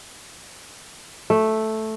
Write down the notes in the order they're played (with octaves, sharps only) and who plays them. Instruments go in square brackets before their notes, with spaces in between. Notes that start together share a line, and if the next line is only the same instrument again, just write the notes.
[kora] A3